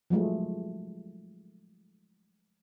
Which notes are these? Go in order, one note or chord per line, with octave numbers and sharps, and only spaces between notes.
F3 F#3 G#3 A3